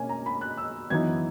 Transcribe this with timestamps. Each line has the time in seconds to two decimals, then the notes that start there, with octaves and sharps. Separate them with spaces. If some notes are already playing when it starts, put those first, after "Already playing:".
Already playing: B2 A#3 C#4 G#5
0.09 A#5
0.26 B5
0.41 F#6
0.57 E6
0.90 F#2 E3 B3 D#4 G#6